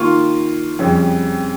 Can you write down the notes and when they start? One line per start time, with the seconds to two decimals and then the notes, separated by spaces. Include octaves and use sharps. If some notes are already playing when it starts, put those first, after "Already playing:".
Already playing: D#3 A#3 F4 C#6
0.79 F2 C#3 G3 C#4